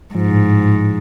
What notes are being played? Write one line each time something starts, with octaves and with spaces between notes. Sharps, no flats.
G#2 F3
A2